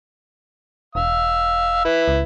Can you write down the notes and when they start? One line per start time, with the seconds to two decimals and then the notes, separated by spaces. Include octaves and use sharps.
0.95 E1 F5 E6
1.85 E4 B4
2.08 C#2